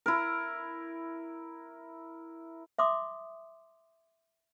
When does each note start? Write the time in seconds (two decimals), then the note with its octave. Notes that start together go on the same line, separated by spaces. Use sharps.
0.06 E4 A#4
2.78 E5 C6 D6 D#6